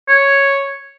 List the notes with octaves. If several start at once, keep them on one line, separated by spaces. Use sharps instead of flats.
C#5